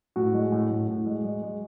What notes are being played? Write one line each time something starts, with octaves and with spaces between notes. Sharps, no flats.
A2 F#4
G#3
A2
A2
A2
G#3
G#3
G#3